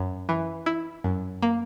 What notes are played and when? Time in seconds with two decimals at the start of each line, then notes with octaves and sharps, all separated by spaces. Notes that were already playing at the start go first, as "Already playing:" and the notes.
Already playing: F#2
0.29 E3
0.66 E4
1.04 F#2
1.42 A#3